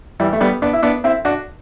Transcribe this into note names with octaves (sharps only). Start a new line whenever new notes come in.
E3 G3
A3
G3 B3
B3 D4
E4
B3 D4
C4 E4
D4 F#4